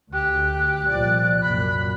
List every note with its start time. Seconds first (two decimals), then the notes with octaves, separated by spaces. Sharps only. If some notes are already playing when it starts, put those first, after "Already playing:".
0.13 D2 G4 F#6
0.89 C2 A#2 F3 D5
1.43 F#2 A#2 B5